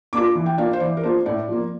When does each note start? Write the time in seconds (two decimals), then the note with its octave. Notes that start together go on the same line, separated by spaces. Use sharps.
0.13 A#3 D4 F4 D6
0.35 E3
0.46 G5
0.58 A#3 D4 F4 F5
0.73 C5
0.80 E3 D5
0.97 A#4
1.03 A#3 D4 F4 C5
1.26 A2 D5
1.49 F3 A#3